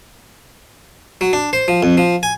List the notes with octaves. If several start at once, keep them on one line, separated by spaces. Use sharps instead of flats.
F#3
D4
C5
F3
F2
F3
G#5